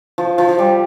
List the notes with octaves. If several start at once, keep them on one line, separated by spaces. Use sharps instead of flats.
F3
F3
F3
G3